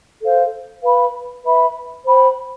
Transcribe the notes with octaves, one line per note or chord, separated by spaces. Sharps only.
A4 C5 F5
B4 F5 B5
B4 E5 B5
C5 G5 B5